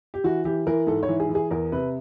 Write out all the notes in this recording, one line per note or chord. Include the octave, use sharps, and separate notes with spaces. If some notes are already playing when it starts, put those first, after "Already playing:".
G4
E3 F#4
E3 G4
E3 A#4
G#2 A4
C#5
E3
G#4
E3
G#4
E2 A#4
C3 B4